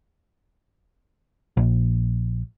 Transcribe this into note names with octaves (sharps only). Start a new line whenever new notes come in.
A#1